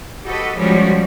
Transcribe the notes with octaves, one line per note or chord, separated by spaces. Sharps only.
F#4 G4 A4 B4 D#5
F3 G3 G#3 C#4 F#4